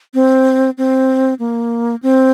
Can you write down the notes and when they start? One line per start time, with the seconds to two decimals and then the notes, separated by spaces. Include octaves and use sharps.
0.14 C4
0.78 C4
1.39 A#3
2.03 C4